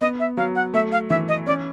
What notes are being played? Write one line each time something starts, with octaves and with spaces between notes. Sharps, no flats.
B3 D#5
E5
F#3 F5
F#5
A3 E5
F5
E3 E5
D#5
C#4 D5